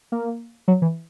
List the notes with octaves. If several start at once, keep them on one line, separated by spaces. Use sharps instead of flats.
A#3
F#3
E3